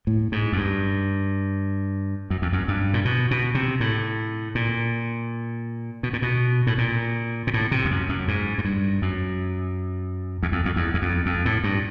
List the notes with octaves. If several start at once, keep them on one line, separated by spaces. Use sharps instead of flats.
A2
G#2
F#2
G2
F#2
F2
F#2
G2
A#2
B2
B2
C3
A2
A#2
B2
A#2
B2
A2
A#2
A#2
A2
C3
F2
F#2
F#2
G#2
G#2
G2
F#2
E2
F2
F2
E2
E2
F2
F2
A2
G2